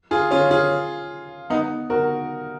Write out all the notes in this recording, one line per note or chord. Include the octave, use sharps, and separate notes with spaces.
F4 G#4
C#4 F4
F4 G#4
B3 D#4
F#4 A#4